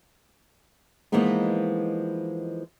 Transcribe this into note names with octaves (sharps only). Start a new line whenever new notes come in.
E3 F3 G#3 A#3 B3 D#4